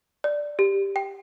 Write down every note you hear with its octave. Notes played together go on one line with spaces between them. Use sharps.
D5
G4
G5